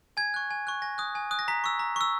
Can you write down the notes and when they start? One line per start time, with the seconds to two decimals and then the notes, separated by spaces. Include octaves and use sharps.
0.17 G#5 G#6
0.34 C#6 F#6
0.50 G#5
0.67 C#6 F#6
0.82 G#5 A#6
0.98 D#6 F#6
1.15 G#5
1.31 D#6 F#6
1.39 A#6
1.48 A#5 B6
1.64 C#6 E6
1.79 A#5
1.96 C#6 E6